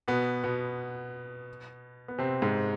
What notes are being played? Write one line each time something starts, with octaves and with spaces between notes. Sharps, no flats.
B2 B3
B2 B3
B3
C3 C4
G#2 G#3